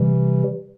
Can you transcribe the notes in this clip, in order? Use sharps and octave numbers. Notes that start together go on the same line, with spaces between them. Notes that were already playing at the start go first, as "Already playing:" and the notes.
Already playing: C3 E3 G3